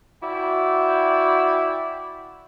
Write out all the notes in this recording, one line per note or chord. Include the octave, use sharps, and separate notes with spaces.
E4 F#4 D5 E5 G5